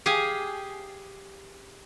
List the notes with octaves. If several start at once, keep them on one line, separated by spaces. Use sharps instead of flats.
G4 G#4 F5 G#5